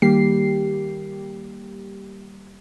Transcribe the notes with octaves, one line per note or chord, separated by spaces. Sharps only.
D#3 G3 A#3 G4 C7